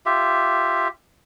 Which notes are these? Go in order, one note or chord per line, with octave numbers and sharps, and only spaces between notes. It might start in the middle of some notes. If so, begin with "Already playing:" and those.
F4 G4 E5